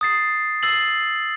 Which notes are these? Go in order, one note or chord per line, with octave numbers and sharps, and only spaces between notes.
D#6 A6 C7
E6 A6 C7 F#7